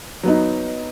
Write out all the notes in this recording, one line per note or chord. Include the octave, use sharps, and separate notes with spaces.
F#3 B3 D#4